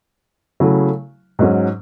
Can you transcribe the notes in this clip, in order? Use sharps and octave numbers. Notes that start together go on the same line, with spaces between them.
C#3 F#3 A3 E4
G#2 F#3 C#4